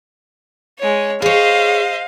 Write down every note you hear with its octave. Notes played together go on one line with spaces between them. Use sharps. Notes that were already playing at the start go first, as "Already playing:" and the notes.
G#3 C#5
G#4 C5 C#5 D#5 F5